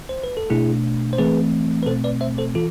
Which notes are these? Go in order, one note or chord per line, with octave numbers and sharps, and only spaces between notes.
C5
B4
A4
B2 A3 D4 E4 G#4
C5
E3 A3 C4 G#4 B4
B4
B2 A3 C4 A4 C5
B4 D5
C5 E5
A4 C5
E3 F4 A4